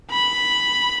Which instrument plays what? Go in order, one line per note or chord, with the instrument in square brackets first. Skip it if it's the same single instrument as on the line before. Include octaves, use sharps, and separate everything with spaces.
[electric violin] B5